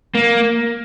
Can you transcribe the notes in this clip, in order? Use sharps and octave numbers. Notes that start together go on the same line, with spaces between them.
A#3